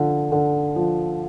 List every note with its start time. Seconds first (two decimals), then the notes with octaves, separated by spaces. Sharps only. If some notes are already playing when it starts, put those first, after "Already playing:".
Already playing: D3 F3
0.32 D3
0.76 F3